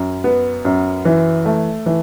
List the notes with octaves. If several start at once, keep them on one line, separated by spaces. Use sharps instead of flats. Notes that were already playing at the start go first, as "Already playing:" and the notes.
Already playing: F#2
B3
F#2
E3
A3
E3